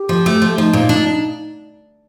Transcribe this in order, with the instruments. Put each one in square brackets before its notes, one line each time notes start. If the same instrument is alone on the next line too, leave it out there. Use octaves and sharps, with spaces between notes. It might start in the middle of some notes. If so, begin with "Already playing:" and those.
Already playing: [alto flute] G4
[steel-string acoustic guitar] F3
A3
F3
[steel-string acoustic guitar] F3 [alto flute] D#4
[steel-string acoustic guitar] A#2
D4